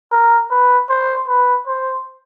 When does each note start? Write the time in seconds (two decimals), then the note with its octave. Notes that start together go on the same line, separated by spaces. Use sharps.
0.12 A#4
0.51 B4
0.89 C5
1.28 B4
1.67 C5